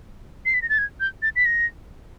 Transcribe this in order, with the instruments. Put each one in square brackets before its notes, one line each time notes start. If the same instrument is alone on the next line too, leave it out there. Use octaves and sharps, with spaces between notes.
[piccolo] C7
B6
A#6
A6
G#6
G6
A6
B6
A#6